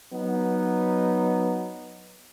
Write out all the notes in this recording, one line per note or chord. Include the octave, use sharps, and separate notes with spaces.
F#3 B3 D#4